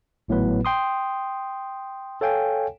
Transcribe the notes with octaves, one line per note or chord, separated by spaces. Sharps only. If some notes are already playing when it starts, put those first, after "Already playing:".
G#1 A2 F#3 B3 B4
G5 C6 D#6
A4 C#5 F5 G5 G#5